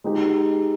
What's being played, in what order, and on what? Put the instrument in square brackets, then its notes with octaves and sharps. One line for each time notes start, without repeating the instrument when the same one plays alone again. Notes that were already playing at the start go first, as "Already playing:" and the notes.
[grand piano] G#3 D#4 G4